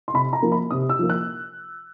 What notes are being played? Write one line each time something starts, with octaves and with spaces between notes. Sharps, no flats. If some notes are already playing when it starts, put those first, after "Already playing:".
C6
C3 B5
A#5
F3 A#3
B5
C3 D#6
E6
F3 A#3
F#6